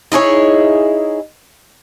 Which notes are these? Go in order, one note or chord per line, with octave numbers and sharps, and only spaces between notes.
D#4 E4 G#4 C#5